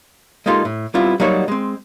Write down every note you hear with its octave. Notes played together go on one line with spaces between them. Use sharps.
G#3 A#3 D#4 F4 G4 A4
A2
G3 B3 C4 E4 F4
F#3 G3 A#3 D#4 F#4 C#5
G#3 C4